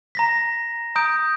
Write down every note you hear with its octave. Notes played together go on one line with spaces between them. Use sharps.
A#5 A#6 B6
A#5 D#6 G6 D7